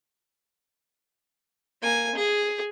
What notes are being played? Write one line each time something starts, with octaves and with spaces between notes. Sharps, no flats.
A#3 G#5
G#4